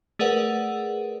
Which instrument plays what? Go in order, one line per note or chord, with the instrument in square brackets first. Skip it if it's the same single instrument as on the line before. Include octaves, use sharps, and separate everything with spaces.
[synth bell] A3 G#4 A#4 B4 D5 F#5